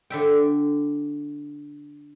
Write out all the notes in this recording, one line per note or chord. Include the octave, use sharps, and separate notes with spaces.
D3 E5 G5